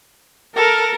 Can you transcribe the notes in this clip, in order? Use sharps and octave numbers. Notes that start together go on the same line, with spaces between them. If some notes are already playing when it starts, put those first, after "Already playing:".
A4 A#4